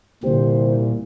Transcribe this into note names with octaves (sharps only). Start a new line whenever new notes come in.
C2 A#2 D3 G4 C5